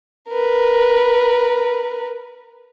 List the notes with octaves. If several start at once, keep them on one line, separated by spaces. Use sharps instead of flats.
A#4 B4